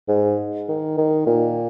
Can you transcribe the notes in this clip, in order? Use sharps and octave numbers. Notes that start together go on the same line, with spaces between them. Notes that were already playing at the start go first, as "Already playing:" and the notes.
G#2
D#3
D#3
A#2